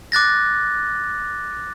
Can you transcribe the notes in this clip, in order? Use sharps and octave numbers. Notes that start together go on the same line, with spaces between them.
D6 F#6 A6 A#6